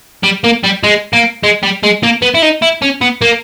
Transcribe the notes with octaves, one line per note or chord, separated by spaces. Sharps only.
G3
A#3
G3
G#3
A#3
G#3
G3
G#3
A#3
B3
E4
D#4
E4
C#4
B3
A#3